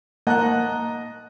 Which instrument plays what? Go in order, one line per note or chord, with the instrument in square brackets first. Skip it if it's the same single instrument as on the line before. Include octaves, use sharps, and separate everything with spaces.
[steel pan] A#3 F#5 A5 [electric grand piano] D#5 A#5 F#6